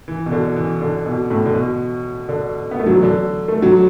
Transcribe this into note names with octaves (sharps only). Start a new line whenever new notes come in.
E3
B2
D3
E3
D3
B2
A2
D3
B2
D3
B3
A3
F#3
E3
D3
A3
F#3